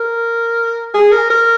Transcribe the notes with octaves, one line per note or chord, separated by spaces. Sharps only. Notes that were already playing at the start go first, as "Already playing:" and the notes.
Already playing: A#4
G#4
A#4
A#4